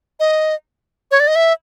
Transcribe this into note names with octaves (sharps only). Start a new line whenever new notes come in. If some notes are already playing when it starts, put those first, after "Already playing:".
D#5
C#5
D5
D#5
E5